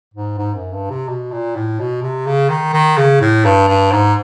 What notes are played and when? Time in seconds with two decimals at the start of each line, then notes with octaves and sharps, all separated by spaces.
0.14 G#2
0.38 G#2
0.55 F#2
0.72 G2
0.90 C3
1.08 B2
1.32 A#2
1.55 A2
1.79 B2
2.03 C3
2.26 C#3
2.49 D#3
2.73 D#3
2.97 C#3
3.20 A2
3.45 G2
3.68 G2
3.92 G#2